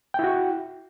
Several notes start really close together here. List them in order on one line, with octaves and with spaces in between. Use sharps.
G5 E4 F#4